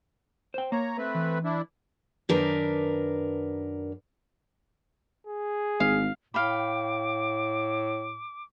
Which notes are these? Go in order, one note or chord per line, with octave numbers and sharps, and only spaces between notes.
C5 G5
A#3 C#5 A#5
A3 C4 B4
E3
D4 E4
F#2 D#3 D4 A#4 B4
G#4
G#1 F5
A2 F5 G5 B5 D6